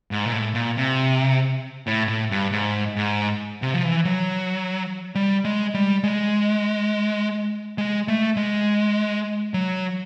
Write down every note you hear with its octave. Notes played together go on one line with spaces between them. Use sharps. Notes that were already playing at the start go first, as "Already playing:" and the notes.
G#2
A#2
A2
A#2
C3
A2
A2
G2
G#2
G#2
C3
F3
E3
F#3
G3
G#3
G3
G#3
G#3
A3
G#3
F#3